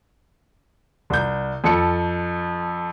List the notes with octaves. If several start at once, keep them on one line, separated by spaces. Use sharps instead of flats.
C2 G6
F2 A4 C#7